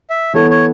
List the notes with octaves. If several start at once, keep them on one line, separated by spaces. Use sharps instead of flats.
E5
E3 B3 A4 C#5
C#5